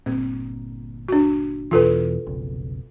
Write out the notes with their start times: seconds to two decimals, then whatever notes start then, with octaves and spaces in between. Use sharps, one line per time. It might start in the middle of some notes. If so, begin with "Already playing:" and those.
0.06 G1 A#2 C4
1.09 D4 F#4
1.71 E2 B2 E3 F4 A4 B4
2.26 F1 B1 C#3